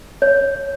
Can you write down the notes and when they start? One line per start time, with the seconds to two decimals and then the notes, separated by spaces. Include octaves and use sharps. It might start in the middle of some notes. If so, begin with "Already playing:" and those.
0.22 C#5